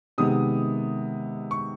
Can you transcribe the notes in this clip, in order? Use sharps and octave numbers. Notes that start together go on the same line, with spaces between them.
C3 D#3 G#3 B3 D#6
C#6